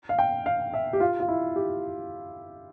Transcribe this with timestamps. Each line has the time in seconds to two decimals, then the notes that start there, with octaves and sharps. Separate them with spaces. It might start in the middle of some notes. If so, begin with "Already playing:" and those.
0.09 F5
0.19 G5
0.46 F5
0.74 E5
0.93 G4
1.00 F4
1.20 F4
1.28 E4
1.56 G4